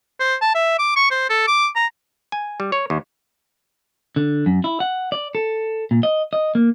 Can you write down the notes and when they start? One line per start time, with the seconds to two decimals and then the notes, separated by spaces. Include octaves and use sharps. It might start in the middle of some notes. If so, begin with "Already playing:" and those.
0.20 C5
0.42 A5
0.55 E5
0.79 D6
0.96 C#6
1.11 C5
1.30 A4
1.48 D6
1.75 A#5
2.32 G#5
2.60 G3
2.72 C#5
2.90 D#2
4.16 D3
4.46 F#2
4.64 E4
4.80 F#5
5.12 D5
5.35 A4
5.91 A#2
6.03 D#5
6.33 D#5
6.55 A#3